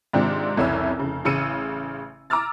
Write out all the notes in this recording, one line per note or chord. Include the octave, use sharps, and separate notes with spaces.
G#2 C3 D#3 C4 D4 F4
F1 C2 C#3 C#4 E4 E6
F1 C#3
A1 C#3 E6 C#7 D#7
A#5 D6 E6 F6 A6